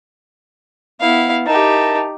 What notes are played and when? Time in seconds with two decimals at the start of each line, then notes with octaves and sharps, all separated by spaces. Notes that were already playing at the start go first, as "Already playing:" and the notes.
1.01 B3 E4 F5
1.46 D#4 E4 G4 A#4 A5